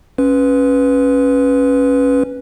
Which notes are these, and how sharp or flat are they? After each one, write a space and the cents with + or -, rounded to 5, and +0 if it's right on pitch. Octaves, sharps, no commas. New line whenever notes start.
C#4 -10 B4 +0